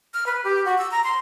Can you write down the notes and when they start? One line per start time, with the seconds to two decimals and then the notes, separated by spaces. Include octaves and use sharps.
0.14 F6
0.26 B4
0.44 G4
0.66 F#4
0.78 E6
0.91 A#5
1.04 C6